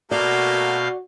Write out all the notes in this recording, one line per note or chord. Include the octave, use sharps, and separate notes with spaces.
B2 A3 A#3 F#4 D5 F5 G6